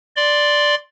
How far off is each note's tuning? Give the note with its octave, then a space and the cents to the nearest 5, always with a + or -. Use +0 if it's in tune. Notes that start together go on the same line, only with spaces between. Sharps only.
D5 +0 C6 +0